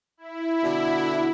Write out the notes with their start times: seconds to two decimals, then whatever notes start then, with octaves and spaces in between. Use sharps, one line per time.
0.17 E4
0.63 B2 D3